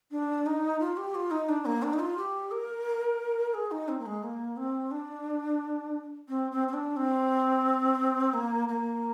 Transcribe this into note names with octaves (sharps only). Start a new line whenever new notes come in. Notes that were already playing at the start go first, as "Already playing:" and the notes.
D4
D#4
F4
G4
F4
D#4
D4
A#3
D4
D#4
F4
G4
A#4
G#4
D#4
C4
A#3
G#3
A#3
C4
D4
C4
C4
C4
D4
C4
A#3
A#3